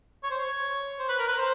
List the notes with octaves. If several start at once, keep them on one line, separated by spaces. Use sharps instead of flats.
C#5
C5
C#5
C5
B4
A#4
B4
C5